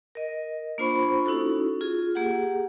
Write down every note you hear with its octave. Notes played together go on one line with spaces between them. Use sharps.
A#4 D#5
A#3 D4 F4 C5 B5 C#6
C#4 D#4 E4 F#4 A4
F4 G#4
A#3 G4 G#4 F#5